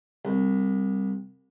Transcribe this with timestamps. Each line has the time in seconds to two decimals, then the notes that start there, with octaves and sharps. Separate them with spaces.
0.25 C2